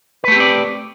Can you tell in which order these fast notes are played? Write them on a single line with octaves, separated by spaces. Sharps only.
B4 A3 G4 C4 D5